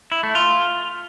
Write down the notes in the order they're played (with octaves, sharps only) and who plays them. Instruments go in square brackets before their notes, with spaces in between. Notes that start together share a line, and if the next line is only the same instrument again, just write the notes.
[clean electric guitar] E4
A3
F4